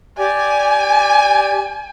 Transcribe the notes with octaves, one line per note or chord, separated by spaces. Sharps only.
G4 D5 G#5